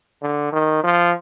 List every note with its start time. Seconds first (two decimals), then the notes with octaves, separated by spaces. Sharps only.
0.22 D3
0.53 D#3
0.84 F3